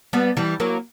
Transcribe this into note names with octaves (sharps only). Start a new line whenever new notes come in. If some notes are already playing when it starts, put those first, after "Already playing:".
G3 B3
E3 G3
F#3 A#3